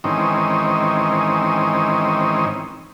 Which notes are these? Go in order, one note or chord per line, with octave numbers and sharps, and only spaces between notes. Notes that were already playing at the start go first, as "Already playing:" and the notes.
G#2 D#3 E3 C4 C#4 D#4